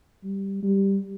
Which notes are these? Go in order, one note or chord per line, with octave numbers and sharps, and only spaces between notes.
G3
G3